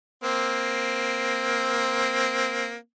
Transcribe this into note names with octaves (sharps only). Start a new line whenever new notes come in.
A#3 C4